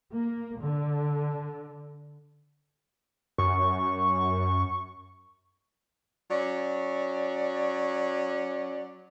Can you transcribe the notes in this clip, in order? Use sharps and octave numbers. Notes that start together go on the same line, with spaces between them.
A#3
D3
F#2 C#6
F#3 C#4 D5